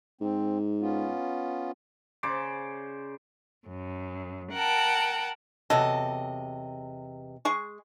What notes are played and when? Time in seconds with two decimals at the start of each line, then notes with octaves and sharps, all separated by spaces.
0.21 G#2 C4
0.80 B3 C#4 F4
2.23 C#3 C5 D5 D6
3.68 F#2
4.53 A#4 F#5 G5 A5
5.70 E2 C3 F#3 A4 D#5
7.45 G#3 G#4 C#6